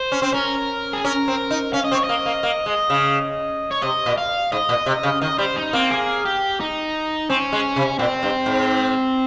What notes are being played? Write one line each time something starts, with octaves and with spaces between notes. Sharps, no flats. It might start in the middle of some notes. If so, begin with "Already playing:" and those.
Already playing: C5
C#4
C4
C#4 A#4
G#4
C#4 A#4
C4
D#4
C#4 F5
D#5
C4
C#5
D#5
A#3
A#3
A#3
G#3
C#3
C#5
C3 D#5
A#2
F5
G#2 D#5
A#2
C3
C#3
D#3 D#5
G3 C5
D#4
A#3 C4
G#4
G4
D#4
C4 C#4
G#3
C3
A#2 C4
G2
G#2